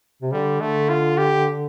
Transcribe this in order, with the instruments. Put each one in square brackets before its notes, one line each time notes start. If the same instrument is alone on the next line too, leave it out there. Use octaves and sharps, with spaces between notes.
[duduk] C3
[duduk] D3 [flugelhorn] G3
[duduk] D3 [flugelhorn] A3
[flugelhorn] F4
G4